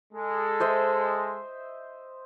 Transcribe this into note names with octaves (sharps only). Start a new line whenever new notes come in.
G#3 A4
C5 D#5 E5